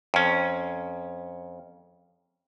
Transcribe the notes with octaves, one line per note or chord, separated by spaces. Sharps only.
F2 C#4